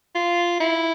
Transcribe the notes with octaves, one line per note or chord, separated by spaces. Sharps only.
F4
E4